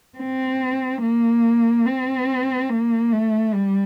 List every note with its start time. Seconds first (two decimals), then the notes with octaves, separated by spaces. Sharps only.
0.18 C4
1.02 A#3
1.86 C4
2.69 A#3
3.12 A3
3.54 G3